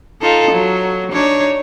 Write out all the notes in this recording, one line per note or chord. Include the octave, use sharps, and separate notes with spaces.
D#4 F4 A4
F#3
D4 D#4 C#5